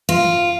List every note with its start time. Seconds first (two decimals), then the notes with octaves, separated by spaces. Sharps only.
0.09 F4